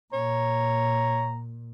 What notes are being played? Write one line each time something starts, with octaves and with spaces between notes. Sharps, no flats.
A#2 C#5 A#5